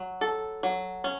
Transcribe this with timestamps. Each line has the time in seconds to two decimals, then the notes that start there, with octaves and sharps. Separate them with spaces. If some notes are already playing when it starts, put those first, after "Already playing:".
Already playing: F#3
0.21 A4
0.63 F#3
1.04 C#4